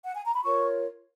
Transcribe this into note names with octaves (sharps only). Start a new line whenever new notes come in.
F#5
G#5
A#5
B5
F4 A#4 C#5 C#6